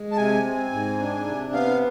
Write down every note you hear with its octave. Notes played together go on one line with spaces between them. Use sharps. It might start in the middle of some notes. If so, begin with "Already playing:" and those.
Already playing: G#3
A5
C3 G#5
C4
G#2
D4
C3
B3 F5